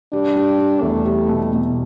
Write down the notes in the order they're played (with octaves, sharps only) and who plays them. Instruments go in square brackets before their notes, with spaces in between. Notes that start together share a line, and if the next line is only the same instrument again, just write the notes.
[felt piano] G3 [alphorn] D4
[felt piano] G3
G3
[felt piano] E2 [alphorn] A3
[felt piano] G3
B2
B2